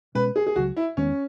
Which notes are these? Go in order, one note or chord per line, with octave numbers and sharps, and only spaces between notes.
B2 G#3 C#4 B4
G#4
G#4
C#2 C#3 F#3 F#4
E4
E2 D#3 G#3 B3 C#4